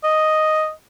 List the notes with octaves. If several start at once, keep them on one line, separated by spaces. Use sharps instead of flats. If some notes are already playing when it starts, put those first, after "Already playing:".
D#5